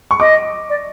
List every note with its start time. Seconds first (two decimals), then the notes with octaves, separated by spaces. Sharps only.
0.11 C#6
0.20 D#5 D6
0.70 D5